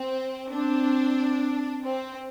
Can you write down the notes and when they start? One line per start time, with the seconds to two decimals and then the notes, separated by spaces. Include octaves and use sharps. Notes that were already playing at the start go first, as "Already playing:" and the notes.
Already playing: C4
0.52 C4 D4
1.84 C4